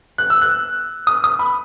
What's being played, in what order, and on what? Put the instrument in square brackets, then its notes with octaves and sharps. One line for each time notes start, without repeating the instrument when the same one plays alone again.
[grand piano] F#6
E6
F#6
D#6
D#6
B5